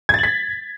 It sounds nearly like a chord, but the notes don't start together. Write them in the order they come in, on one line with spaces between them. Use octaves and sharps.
G#6 A6 F#7 B6